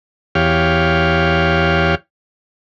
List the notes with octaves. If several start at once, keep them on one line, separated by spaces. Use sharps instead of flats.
E2 G4 C#5 F5